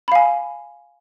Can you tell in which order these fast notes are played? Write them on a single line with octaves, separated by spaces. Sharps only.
B5 F5 G#5